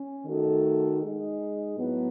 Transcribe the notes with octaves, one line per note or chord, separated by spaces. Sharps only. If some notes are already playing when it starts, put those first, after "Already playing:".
Already playing: C#4
D#3 A3 D#4 F#4 A4
G#3 D#4 G#4
A2 F#3 B3